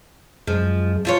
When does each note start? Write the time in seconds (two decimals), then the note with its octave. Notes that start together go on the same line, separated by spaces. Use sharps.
0.47 F#2 F3 G#3
1.05 F3 F4 C#5